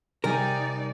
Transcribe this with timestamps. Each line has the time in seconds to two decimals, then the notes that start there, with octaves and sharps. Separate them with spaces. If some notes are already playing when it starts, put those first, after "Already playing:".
0.24 C3 G3 D#4 A#4 D5 G#5